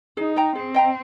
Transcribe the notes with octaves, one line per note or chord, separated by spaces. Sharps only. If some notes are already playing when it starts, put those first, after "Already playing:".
D#4 G#4
D#5 G5 A#5
C4 G#4
D#5 G5 A#5